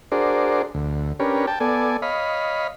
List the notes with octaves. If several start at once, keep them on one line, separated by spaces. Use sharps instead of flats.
D4 F#4 G#4 A#4 C5 D5
D2
C#4 D4 G4 A#4 B4 C#5
G5 A5
B3 A4 D5 G#5
C#5 D#5 F5 B5